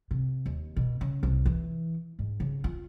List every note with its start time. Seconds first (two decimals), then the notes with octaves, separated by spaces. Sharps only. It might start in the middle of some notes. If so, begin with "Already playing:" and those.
0.11 C3
0.46 D#2
0.76 B2
1.01 C#3
1.23 C2
1.46 E3
2.19 G#2
2.40 C#3
2.64 F4